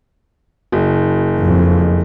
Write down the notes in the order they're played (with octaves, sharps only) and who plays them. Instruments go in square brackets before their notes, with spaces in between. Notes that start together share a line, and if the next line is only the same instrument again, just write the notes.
[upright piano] F#1
[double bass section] F2